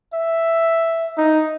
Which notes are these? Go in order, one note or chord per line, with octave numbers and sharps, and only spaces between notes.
E5
D#4